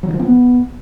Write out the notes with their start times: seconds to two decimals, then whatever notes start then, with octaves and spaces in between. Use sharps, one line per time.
0.03 F#3
0.09 D#3
0.14 F3
0.19 C4
0.25 B3